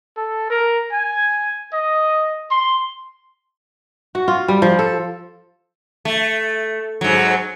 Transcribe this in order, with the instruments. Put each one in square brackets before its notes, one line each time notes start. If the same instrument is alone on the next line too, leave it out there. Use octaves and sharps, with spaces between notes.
[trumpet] A4
A#4
G#5
D#5
C6
[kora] F#4
F4
G3
F3
A4
[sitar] A3
G#2 F#3